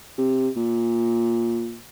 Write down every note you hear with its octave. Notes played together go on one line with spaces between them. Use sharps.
C3
A#2